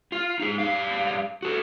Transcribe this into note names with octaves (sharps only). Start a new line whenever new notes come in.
F4
D#4 G#4
G3 F5
F#4 A4